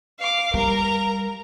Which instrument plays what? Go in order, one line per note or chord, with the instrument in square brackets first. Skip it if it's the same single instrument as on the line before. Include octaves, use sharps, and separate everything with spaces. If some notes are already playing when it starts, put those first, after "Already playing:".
[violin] F5 D6
[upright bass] G3 [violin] A#4 A#5